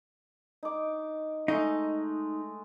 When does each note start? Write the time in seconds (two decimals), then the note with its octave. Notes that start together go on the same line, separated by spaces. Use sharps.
0.63 D#4 D6
1.48 G#3 A3 D#4